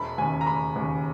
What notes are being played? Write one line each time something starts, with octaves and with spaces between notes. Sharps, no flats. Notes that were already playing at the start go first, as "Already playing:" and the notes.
Already playing: E1 B5
D#2 C#3 G#5
A#5
E1 B5
D#2 C#3